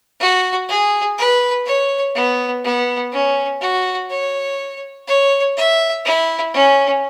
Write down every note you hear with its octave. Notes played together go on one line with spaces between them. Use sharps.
F#4
G#4
B4
C#5
B3
B3
C#4
F#4
C#5
C#5
E5
E4
C#4